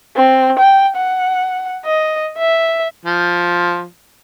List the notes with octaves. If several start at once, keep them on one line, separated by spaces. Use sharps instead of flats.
C4
G5
F#5
D#5
E5
F3